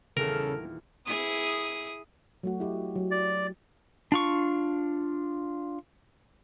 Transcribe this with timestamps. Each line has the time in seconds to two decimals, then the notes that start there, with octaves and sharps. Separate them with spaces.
0.17 D#1 E2 C#3 A4 A#4 F6
1.07 E4 G#4 D#6
2.43 F#3 A3 F#4
2.60 E4 G4 D#5
2.96 F#3
3.11 D5
4.12 D4 F4 C#6